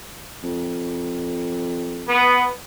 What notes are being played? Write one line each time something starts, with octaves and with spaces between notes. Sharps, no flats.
F2
B3